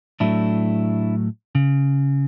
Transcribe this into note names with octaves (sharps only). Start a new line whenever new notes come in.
A2 F#3 A3 D4 E4
C#3